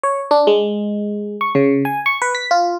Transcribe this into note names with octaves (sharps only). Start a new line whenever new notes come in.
C#5
D4
G#3
C#6
C#3
G#5
C#6
B4
B6
F4